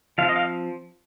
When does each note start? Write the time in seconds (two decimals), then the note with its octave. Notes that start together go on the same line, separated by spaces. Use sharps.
0.18 F3 C4 F5
0.29 D#5
0.36 F5